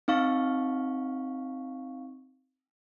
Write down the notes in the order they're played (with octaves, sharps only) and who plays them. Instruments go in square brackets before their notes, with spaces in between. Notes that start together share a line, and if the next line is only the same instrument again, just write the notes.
[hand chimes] C4 D#4 F5 C#6